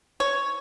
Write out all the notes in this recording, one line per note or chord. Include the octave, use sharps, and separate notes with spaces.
C#5